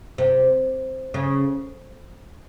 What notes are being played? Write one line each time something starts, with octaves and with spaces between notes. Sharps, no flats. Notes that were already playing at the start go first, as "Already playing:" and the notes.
C3
C#3